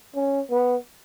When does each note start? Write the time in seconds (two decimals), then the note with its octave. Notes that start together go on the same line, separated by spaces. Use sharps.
0.15 C#4
0.51 B3